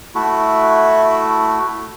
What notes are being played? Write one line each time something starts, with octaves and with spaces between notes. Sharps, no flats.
A3 E4 F#4